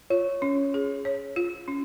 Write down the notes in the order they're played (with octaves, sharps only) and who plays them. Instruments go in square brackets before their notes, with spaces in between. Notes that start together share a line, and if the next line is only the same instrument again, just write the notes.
[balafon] F4 [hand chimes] C#5
[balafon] C#4
G#4
C#5
F4
C#4